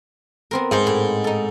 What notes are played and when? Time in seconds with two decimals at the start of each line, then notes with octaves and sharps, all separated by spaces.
0.51 B3 C4 A#4
0.71 G#2 A#4 C5
0.87 A2
1.24 D#4 A4